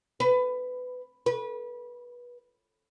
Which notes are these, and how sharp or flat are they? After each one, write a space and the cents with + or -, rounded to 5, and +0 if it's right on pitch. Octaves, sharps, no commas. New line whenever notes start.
B4 +20
B4 -25